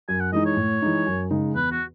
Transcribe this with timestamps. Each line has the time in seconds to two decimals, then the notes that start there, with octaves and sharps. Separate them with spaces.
0.09 F#2 G#5
0.20 F#5
0.32 E3 G#3 D#4 D#5
0.45 C#5
0.57 A2
0.82 E3 G#3 D#4
1.06 F#2
1.30 C#3 G#3 D#4
1.55 E2 B4
1.72 F#4